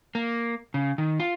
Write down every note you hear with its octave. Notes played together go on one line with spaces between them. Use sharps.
A#3
C#3
D#3
F4